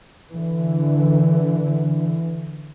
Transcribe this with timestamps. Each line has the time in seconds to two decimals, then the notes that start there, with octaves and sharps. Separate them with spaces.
0.34 D3 E3